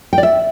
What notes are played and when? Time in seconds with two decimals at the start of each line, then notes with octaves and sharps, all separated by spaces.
0.13 G5
0.18 D5
0.23 E5